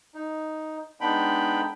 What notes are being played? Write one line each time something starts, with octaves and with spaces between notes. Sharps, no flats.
D#4
G#3 B3 D4 D#4 G5 B5